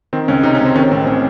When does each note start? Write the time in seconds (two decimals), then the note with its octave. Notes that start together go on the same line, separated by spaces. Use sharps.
0.13 D#3 C4
0.28 C#2 C#4
0.43 C3 D#4
0.55 C#4
0.60 C#2 C4
0.76 D#3 C#4
0.91 A1 C4
1.07 C#4